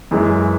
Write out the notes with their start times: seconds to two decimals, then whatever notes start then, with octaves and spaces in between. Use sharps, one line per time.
0.11 F#2 E3 G#3